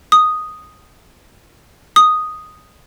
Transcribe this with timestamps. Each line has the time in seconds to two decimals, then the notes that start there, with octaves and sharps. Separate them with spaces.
0.12 D#6
1.96 D#6